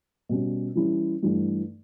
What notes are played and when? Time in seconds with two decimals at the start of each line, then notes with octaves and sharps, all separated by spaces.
0.29 B2 G3 C#4
0.75 E3 G3 C#4 E4
1.23 G2 E3 A3